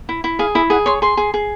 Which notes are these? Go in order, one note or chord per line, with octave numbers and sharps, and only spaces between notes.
E4
E4
G#4 F5
E4 E5
G#4 F#5
C#5 C6
G#4 C6
G#4
G#4